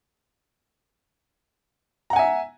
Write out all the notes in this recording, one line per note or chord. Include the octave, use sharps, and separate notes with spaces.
E5 F#5 G#5 A#5